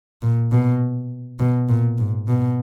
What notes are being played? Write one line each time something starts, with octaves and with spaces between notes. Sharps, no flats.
A#2
B2
B2
A#2
G#2
B2